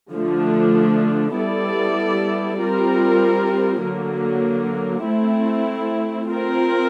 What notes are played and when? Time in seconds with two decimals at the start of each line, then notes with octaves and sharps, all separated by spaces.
0.12 D3 F3 A3 D4
1.35 G3 B3 E4 A4 D5
2.58 G3 C4 F4 A#4
3.82 D3 F#3 A#3
5.04 A3 C4 E4
6.28 C4 F4 A#4